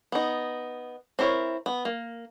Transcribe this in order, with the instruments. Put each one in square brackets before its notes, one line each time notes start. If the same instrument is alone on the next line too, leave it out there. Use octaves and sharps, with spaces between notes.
[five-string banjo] B3 D#4
C4 D4 E4 A#4 C#5
B3
A#3